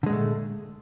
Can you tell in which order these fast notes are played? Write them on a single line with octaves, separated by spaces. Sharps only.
D3 G#3 A#2 A3